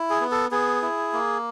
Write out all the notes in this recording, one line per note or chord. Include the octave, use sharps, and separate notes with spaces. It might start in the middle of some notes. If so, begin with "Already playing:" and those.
Already playing: E4
G#4
B3
A4
B3 G#4
E4
A#3